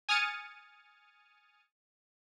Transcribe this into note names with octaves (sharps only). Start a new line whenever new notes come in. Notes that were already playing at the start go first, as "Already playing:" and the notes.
G#5 D#6 F6 A6 C#7 D#7